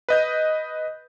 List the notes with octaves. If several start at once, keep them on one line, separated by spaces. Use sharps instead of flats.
B4 D#5 G6